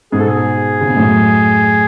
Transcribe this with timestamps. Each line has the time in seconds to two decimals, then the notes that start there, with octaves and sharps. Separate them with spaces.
0.12 G#2 B2 G#4
0.20 A4
0.28 G#4
0.81 C#3
0.89 B2
0.97 F#2 A2